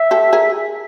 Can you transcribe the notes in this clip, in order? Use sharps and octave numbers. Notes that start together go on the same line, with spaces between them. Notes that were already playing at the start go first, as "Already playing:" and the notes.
Already playing: E5
G4 A4
G#4 A#4